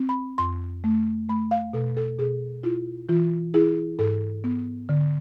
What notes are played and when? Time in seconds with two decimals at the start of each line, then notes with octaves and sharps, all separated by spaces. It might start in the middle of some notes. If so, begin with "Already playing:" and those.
Already playing: C4
0.09 B5
0.38 F2 C6
0.84 A3
1.29 A3 B5
1.51 F5
1.73 B2 A4
1.97 A4
2.19 B2 G#4
2.63 E4 F4
3.09 E3 F4
3.54 E4 G#4
3.99 G#2 A4
4.44 B3
4.89 D3